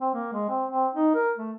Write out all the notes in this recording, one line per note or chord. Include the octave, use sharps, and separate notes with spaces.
C4
A#3
G#3
C4
C4
D#4
A#4
A3